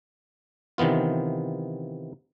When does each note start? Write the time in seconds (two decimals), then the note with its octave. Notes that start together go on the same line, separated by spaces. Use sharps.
0.78 C3 D#3 E3 B3 F4